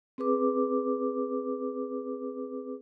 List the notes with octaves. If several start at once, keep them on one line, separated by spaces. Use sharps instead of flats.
C4 G#4 B4 D6